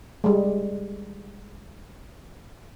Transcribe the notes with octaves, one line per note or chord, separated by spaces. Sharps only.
G3 G#3